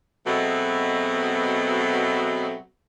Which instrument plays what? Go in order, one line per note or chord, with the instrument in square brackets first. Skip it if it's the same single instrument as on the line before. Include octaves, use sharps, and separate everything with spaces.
[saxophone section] B2 F#3 G#3 A3 B3 C4